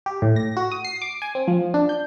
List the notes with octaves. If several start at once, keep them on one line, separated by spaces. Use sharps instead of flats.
G4
A2
A#6
F#4
D#6
C7
D6
G#5
C4
F3
D4
G6